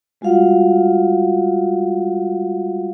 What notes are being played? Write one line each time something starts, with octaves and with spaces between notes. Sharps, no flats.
G3 G#3 F4 F#4 F5 F#5